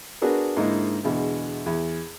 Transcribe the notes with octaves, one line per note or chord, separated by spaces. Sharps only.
B3 D4 F#4 G#4 A#4 B4
G#2 D3 A#3 D#4 E4
E2 B2 D3 G#3
E2